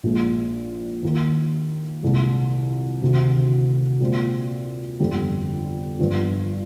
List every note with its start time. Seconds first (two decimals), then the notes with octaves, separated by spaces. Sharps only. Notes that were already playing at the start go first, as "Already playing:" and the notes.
0.03 A#1 A#2 G#3
1.03 D#2 D#3 A#3
2.03 C2 A#2 G#3
3.02 D2 C3 D#3
4.00 A#2 G#3 C4 F4
5.00 G1 F2 D3 G3
5.99 G1 G2 F3